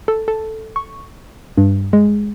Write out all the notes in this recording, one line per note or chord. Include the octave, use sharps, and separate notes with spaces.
A4
A4
C#6
G2
G#3